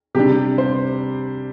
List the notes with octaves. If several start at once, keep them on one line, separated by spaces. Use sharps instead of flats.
C3 G3 D4 G4
C5